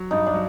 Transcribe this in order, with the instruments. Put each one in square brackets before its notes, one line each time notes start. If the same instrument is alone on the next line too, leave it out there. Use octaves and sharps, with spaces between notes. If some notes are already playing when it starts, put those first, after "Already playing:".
Already playing: [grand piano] F#3
[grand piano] G2 [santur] D#4
[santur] D4
[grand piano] F#3